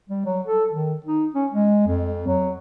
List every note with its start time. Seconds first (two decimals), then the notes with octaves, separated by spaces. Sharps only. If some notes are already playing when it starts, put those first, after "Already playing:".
0.10 G3
0.26 F#3
0.47 A4
0.73 D#3
1.06 D#4
1.34 C#4
1.52 G#3
1.87 F2
2.27 F#3